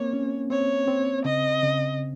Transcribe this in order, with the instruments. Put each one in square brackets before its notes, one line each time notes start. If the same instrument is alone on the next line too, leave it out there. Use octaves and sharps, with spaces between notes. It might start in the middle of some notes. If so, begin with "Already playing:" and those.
Already playing: [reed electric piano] A#3 C4 [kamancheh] C#5
[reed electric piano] C#4
[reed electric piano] C4 [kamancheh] C#5
[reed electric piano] C4
[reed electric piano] C#3 [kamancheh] D#5
[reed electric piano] C#3